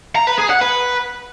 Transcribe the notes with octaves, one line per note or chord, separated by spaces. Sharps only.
A#5
B4
G#4
F#5
B4